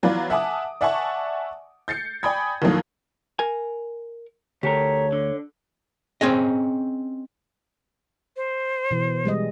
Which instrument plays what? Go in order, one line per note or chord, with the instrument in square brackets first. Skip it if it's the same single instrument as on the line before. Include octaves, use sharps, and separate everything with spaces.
[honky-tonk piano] E3 F#3 B3 F4 B4 D5
E5 F#5 G#5 A5 D6 D#6
D5 E5 F#5 G#5 A5 C#6
G6 A6 C7 C#7
D5 G5 G#5 B5 D#6 G#6
D#2 A2 D#3 F3 F#3 A#3
[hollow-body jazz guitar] A#4 G#5
[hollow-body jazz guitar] D2 [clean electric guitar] G4 A4 A#4 [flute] C#5
[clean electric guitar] D3
[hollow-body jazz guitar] C4 C#4 G#4 D#5
[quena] C5
[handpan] B2 E3
G3 G#3 D#5